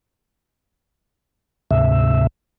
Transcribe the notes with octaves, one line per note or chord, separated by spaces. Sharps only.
D2 G#2 C3 E5